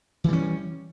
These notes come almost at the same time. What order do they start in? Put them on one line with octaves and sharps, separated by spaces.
E3 G3 C#4